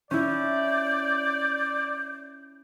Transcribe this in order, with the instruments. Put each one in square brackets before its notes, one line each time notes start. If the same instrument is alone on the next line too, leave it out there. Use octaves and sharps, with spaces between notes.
[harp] C#4 E4 [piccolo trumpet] D5 [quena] G6